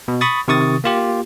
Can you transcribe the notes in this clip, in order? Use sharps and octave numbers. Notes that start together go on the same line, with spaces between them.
B2
B5 C#6 D#6 A6
C3 D#3 C#6 D#6 A6
A#3 F4 G4